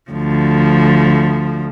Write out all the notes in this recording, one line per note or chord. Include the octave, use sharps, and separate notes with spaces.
D2 F3